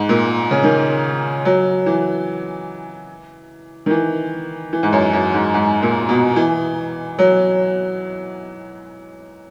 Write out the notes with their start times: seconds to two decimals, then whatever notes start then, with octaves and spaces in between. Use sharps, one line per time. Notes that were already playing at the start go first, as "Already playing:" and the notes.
Already playing: G#2
0.09 A#2
0.51 C#3
0.64 D#3
1.45 F#3
1.86 E3
3.86 D#3
3.91 E3
4.73 E3
4.83 G#2
4.92 F#2
5.13 F#2
5.34 G#2
5.54 G#2
5.82 A#2
6.09 B2
6.36 E3
7.19 F#3